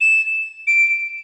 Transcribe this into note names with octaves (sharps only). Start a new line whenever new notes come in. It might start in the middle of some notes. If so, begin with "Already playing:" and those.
E7
D7